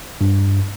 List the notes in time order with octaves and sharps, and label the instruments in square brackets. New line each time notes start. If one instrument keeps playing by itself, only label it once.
[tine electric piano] G2